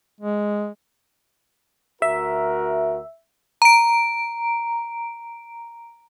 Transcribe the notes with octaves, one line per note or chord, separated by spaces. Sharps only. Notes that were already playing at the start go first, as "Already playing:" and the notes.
G#3
D2 F#4 A#4 E5
A#5 D7